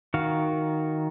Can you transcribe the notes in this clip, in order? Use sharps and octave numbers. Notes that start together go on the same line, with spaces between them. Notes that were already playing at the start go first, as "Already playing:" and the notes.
D#3 F#4 F5